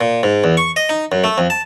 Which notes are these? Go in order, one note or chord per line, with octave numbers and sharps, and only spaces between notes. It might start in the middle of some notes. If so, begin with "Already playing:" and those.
A#2
G#2
E2
C#6
D#5
D#4
F#2
A3
F2
A5